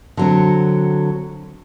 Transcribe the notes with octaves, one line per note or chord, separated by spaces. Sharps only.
D3 F#3 C4